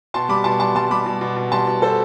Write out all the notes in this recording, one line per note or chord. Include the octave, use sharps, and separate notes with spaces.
B2 A5 C6
G3 B5 D6
B2 A5 C6
G3 A5 C6
G3 A5 C6
G3 B5 D6
B2
B2
B2
G3 A5 C6
B2
B2 A4 C5